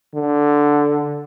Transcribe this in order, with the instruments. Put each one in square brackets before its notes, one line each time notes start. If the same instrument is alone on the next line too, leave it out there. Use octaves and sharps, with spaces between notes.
[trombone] D3